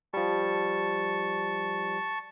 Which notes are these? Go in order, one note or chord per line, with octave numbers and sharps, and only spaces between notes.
F3 G3 A5 C#6